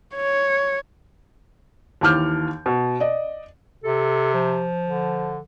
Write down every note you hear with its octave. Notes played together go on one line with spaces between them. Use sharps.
C#5
D#2 E3 A5 D6 F6 G6
B2
D5 D#5
C3 A4
F3
D3